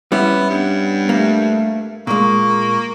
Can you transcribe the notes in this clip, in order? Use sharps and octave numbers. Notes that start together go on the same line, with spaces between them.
G3 B3 C#4 E4
G2 B3
A3 A#3
A#2 G#3 A#3 C#6